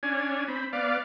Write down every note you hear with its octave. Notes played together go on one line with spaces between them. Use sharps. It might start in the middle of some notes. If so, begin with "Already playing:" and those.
C#4 D4 G#5
C4 B5
B3 D5 F5